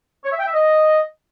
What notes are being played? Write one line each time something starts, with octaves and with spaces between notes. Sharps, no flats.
C#5
E5
G5
E5
D#5